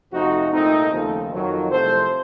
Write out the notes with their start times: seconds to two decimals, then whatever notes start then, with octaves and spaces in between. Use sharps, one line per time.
0.13 F2 C3 F3 A3 D#4 F#4
0.52 C2 A#2 A3 C4 D#4
0.92 D#2 C#3 F3 A3
1.31 F2 D#3 F#3
1.70 C2 C3 F3 A3 A4 C5